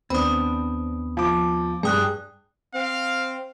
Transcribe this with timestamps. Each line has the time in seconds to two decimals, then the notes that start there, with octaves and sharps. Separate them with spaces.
0.10 D#2 B3 C4 D4 B5 D#6
1.17 F3 D6
1.83 G2 G#4 G5 G#5 D#6 F#6
2.75 C4 F5